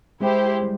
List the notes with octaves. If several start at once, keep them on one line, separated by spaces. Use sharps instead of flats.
G#3 E4 G4 C5
G3